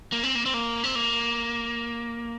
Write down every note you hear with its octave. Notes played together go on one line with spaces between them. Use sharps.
A#3
C4
A#3
C4
A#3
C4
A#3